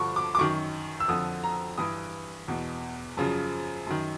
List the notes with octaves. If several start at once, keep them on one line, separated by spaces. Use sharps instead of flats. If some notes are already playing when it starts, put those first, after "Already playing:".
Already playing: G2 D3 F3 C#6
D6
D6
F#2 D#3 C#6
E6
F2 D3 F3 D#6
A#5
G2 E3 D#6
E2 B2
F#2 C#3 F3
F#2 D#3